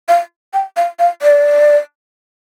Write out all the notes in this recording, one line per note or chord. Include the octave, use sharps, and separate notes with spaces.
F5
G5
F5
F5
D5